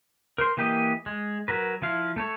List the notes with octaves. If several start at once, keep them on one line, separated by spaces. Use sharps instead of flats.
A#4 C5 C6
E3 A#3 G4 B4 D#5
G#3
F#3 A#4 B4
F3 E4 F5
A3 A4 C#5